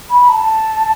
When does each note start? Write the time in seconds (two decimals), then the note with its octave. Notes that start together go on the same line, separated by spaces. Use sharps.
0.09 B5
0.29 A5